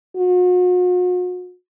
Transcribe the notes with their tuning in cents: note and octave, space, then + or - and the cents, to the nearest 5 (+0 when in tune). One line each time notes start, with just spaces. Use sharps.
F#4 -40